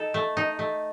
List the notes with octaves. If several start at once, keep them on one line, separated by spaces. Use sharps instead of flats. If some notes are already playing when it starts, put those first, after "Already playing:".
Already playing: D#4 A4
A3
D#4
A3